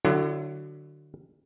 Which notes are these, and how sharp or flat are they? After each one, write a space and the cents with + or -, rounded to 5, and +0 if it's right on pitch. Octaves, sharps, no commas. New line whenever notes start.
D3 +20 F#3 +10 E4 +45